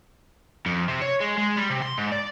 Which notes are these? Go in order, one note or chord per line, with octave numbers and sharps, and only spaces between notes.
F2
C3
C#5
G#3
G#3
G3
C3
C6
G#2
D5